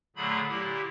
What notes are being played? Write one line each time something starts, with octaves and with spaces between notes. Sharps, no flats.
A#2 D3 F#3 A3 G#4 B5
A#2 E4 G4